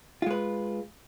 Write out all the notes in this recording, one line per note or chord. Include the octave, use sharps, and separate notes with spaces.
G#3 F4 B4